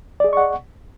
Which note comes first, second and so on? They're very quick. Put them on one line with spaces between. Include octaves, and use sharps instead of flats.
D5 G#4 D#5 C#6 F#5